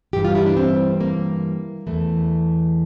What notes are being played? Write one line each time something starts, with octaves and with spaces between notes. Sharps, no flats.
G2 E3 G3 G4
F4
E4
D4
C4
A#3
E2 E3 A3